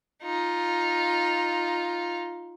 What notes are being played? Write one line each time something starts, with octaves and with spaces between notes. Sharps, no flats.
D#4 F4